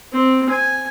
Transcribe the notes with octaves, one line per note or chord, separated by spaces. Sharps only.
C4
G#5